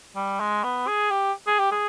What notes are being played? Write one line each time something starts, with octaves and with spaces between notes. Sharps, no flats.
G3
G#3
B3
G#4
G4
G#4
G4
G#4